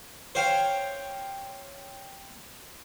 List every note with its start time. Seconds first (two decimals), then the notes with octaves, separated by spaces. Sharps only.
0.35 C5 C#5 F5 G5